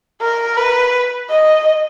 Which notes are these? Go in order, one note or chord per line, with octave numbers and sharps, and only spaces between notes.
A#4
B4
D#5